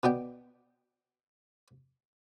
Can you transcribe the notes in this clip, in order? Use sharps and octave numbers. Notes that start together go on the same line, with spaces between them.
B2 B3 D5 G5